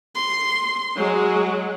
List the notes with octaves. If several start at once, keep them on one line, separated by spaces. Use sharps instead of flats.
C6
F#3 G#3